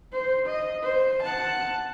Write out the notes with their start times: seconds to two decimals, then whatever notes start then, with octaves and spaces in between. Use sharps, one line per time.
0.12 C5
0.46 D#5
0.83 C5
1.22 F#5 A5